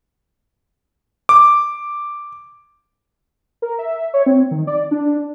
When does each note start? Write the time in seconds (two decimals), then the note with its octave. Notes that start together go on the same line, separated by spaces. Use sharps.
1.29 D6
3.62 A#4
3.79 E5
4.14 C#5
4.26 C4
4.51 D#3
4.67 D5
4.91 D4